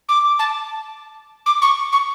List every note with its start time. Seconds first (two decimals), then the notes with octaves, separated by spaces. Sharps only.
0.08 D6
0.39 A5
1.46 D6
1.61 C#6
1.92 C#6